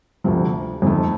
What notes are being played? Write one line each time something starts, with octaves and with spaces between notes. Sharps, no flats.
D2 C3 F3
F2 D#3 A3